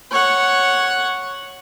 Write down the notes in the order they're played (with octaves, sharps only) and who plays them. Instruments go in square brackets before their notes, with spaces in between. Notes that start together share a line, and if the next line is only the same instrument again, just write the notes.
[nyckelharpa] C#5 F#5